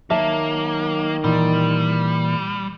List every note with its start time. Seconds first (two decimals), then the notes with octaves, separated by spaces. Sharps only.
0.10 D#3 F#3 A#3 E5 A5
1.24 A#2 E3 G3